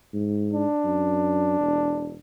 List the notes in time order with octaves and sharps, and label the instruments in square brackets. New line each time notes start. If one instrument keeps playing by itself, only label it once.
[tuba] G#2
[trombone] D4
[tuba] F#2
E1